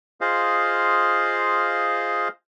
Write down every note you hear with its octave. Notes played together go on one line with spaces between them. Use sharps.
F4 G#4 C5 D#5 F5